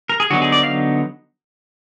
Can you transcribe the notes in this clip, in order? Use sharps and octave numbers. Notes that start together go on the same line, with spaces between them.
A#4
G#4
D3 F#3 B3 D#4 F#4
G#4
D5
F5